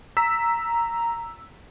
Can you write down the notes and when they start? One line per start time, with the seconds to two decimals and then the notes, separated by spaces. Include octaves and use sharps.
0.17 A#5 E6 B6